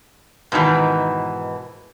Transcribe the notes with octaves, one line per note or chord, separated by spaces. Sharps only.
G#2 B2 D#3 E3